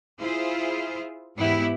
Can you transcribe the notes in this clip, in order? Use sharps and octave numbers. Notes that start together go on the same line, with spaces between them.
E4 F4 G#4 C5
E2 G#2 B3 E4 G4